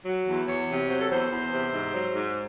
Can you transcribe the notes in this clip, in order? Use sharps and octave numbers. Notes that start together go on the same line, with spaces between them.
F#3
E2
E2 C#5
C3
F#3 C5
A4
E2 C5
E2
C3
G#2
F#3
G#2